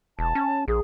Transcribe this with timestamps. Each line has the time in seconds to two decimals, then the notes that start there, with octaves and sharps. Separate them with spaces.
0.19 E1 A5
0.35 C#4
0.68 A#1 G#4